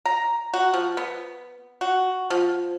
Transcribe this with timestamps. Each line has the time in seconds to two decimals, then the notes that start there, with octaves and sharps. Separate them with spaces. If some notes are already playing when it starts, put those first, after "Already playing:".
0.05 A#5
0.54 F#4
0.73 F3
0.97 B3
1.81 F#4
2.30 F3